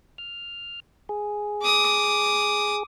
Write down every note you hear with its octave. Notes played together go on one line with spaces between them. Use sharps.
F6
G#4
D6 D#6